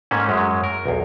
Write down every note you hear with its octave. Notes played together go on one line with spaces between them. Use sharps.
G#2 A3 A#3 C#4
F#2 F#3 G#3
A#4
B1 E2